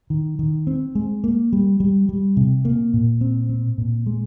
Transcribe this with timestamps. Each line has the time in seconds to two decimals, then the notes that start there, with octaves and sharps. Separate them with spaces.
0.10 D#3
0.39 D#3
0.67 C4
0.95 G#3
1.24 A#3
1.53 G3
1.80 G3
2.09 G3
2.37 C3
2.65 A#3
2.94 A#2
3.21 C4
3.49 C4
3.78 A#2
4.06 G#3